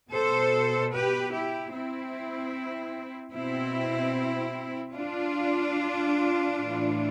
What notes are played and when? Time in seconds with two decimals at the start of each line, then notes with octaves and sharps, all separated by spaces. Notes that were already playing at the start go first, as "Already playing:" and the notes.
0.12 B2 A4 C5
0.92 G4 B4
1.33 E4 G4
1.72 C4 E4
3.33 B2 C4 E4
4.94 D4 F4
6.56 A2 E3